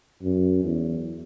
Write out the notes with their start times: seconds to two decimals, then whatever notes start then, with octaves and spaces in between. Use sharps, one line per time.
0.23 F#2
0.64 E2